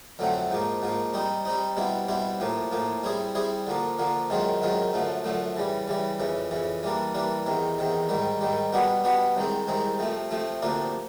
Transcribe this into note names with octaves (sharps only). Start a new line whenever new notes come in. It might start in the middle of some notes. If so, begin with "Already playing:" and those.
F2 D3 F#3 A3 C4
G#2 F3 A#3
G#2 F3 A#3
G3 C4 D#4
G3 C4 D#4
B2 G3 C4 E4
B2 G3 C4 E4
A2 F3 A#3
A2 F3 A#3
G3 C4 E4 G#4
G3 C4 E4 G#4
D3 F3 A#3
D3 F3 A#3
F#2 D#3 G#3 C4 F4
F#2 D#3 G#3 C4 F4
F#2 D3 F3 A3
F#2 D3 F3 A3
C#3 E3 G3
C#3 E3 G3
F2 C#3 E3
F2 C#3 E3
E3 G3 A#3 D4
E3 G3 A#3 D4
E2 C3 D#3
E2 C3 D#3
G#2 D#3 G3
G#2 D#3 G3
B2 G3 B3 D4 F#4
B2 G3 B3 D4 F#4
C2 C3 D#3 G#3 C4
C2 C3 D#3 G#3 C4
C3 F3 A3
C3 F3 A3
D2 C3 F3 A#3 D4